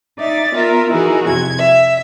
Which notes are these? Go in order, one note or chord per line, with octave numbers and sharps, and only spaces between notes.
D#4 D5 E5 A6
B3 F4 A#4 E5
E3 D#4 E4 F#4 G#4 A#4
F2 C3 G#6
E5